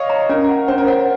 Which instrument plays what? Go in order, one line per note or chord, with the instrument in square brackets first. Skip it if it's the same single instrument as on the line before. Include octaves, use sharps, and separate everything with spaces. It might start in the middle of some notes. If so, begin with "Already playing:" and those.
Already playing: [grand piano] C#5 D#5 F5
[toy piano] A#5
[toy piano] C#4 [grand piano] A#4
[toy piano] F#5
[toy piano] C#4 [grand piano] C5
[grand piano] A#4
[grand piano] C5 [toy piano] F#5